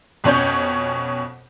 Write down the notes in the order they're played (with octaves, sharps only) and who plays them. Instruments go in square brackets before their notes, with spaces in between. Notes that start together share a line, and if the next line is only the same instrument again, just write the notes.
[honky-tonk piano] F2 B2 C#4 C#5 G6